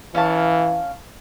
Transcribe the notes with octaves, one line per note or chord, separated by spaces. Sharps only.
E3 C#4 F5 A5